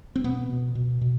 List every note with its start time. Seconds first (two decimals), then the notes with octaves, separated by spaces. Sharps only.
0.16 C4
0.24 B2 B3
0.50 B2
0.75 B2
1.01 B2